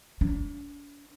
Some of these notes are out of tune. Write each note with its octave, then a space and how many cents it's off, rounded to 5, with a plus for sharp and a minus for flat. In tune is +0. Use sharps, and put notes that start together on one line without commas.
D4 -45